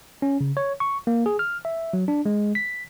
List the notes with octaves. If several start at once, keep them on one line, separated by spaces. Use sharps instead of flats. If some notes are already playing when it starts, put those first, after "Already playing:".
C#4
C#3
C#5
C#6
A#3
G#4
F6
E5
F#3
D4
G#3
B6